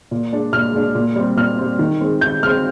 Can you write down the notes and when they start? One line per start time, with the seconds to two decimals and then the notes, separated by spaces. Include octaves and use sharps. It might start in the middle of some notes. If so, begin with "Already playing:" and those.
0.11 A#2
0.32 G#3 D4
0.53 A#2 F6
0.74 G#3 D4
0.95 A#2
1.16 G3 C4
1.37 A#2 F6
1.58 G3 C4
1.79 D#3
2.01 G#3 C4
2.21 D#3 G6
2.43 G#3 F6
2.46 C4